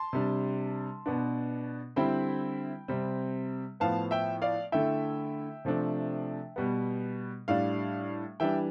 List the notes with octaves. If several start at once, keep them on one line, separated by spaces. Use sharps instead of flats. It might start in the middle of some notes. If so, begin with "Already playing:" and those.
Already playing: A5 C6
C3 G3 D4
B2 B3 D4
D3 G3 C4 E4 G5 B5
C3 G3 C4
A2 F3 B3 F5 A5
E5 G5
D5 F5
D3 A3 E4 E5 G5
C3 F3 A3 D4
B2 G3 B3
A2 G3 D4 D5 F5
E3 G3 D4 E5 G5